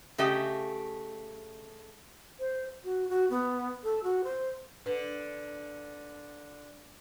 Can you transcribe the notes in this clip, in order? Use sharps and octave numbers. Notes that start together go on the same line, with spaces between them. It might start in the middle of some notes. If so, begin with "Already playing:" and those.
C#3 A3 G4 D#5 A5
C5
F#4
F#4
B3
A4
F#4
C5
D3 B4